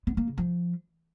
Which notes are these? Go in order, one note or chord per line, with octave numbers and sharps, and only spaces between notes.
B3
A#3
C#3
F3